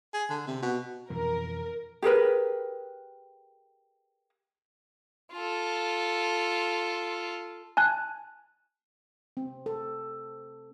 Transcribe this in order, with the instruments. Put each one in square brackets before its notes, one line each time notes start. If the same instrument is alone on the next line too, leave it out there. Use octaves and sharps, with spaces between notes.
[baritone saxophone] G#4
D3
C3
B2
[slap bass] F2 B2 E3 [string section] A#4
[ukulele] G4 G#4 A#4 B4
[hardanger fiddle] F4 A4
[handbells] G#5 A5 F#6
[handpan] C4
A4